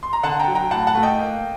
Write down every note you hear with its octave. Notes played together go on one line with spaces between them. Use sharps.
C6
A#5
D3 F#5 A5
G5 A#5
F#3
G5 A#5
A2 F#5 A5
F#5 A5
A3
D#5 G5
A#3